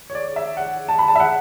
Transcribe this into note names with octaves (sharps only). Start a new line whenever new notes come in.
C#5
D5
E5
F#5
A5
B5
A5
E5
F#5